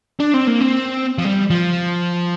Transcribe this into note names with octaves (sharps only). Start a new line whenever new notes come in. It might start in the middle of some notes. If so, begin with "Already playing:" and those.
D4
C4
A#3
C4
F3
G3
F3